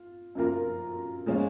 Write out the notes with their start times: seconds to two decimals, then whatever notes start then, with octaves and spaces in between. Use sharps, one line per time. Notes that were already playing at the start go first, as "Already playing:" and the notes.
Already playing: F4
0.35 F#2 F3 A#3 F4 A#4
1.26 F3 G#3 C#4 F4